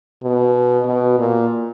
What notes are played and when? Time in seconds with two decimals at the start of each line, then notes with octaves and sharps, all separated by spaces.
0.23 B2
0.86 B2
1.19 A#2